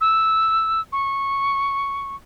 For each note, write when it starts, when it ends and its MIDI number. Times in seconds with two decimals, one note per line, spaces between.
0.01 0.80 88
0.92 2.16 85